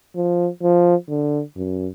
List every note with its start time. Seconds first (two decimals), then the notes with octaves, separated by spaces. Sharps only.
0.16 F3
0.62 F3
1.09 D3
1.56 F#2